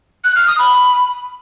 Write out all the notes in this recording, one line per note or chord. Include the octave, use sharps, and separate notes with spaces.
F#6
F6
D#6
B5